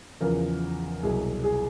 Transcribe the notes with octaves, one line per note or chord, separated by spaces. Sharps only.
E2 C#3 F3 A#4
C2 B2 F#3 G#4
G#4